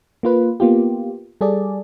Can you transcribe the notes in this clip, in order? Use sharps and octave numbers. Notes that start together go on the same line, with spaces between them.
A#3 F4 B4
A#3 B3 F4 G4
G3 G#4 A4 D5